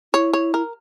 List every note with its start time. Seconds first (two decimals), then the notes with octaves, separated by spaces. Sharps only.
0.13 E4 C#5
0.33 C#5
0.54 A#4